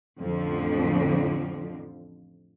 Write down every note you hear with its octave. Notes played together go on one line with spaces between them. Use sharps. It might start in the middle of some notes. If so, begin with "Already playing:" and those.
A1 F2 D3 F3